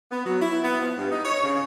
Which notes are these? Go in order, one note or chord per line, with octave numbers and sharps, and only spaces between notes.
B3
F#3
E4
B3
F3
G2
D#4
C#5
C#3